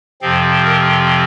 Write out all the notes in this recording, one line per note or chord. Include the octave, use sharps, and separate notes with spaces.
F2 C3 F3 C4 F5
A#4